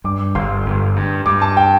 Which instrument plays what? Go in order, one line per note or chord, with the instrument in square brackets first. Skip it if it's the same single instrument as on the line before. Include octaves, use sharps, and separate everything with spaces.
[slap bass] G2 [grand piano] D6
[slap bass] G1 [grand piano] C6
[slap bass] G1
G2
[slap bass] G2 [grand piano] D6
[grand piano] A5
G5